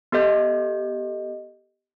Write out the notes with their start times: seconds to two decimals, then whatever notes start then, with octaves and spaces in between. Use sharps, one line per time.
0.12 B3 G4 A4 D#5 G6